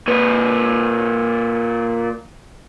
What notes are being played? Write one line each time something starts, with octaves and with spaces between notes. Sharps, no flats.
A#2 B4